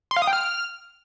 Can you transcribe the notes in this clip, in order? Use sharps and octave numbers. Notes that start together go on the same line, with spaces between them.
C6
F5
D#6
G5
F6